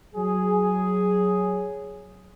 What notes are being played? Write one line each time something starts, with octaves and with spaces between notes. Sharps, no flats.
F#3 G#4